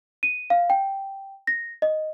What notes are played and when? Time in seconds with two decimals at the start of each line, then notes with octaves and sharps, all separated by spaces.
0.23 D#7
0.50 F5
0.70 G5
1.47 A#6
1.82 D#5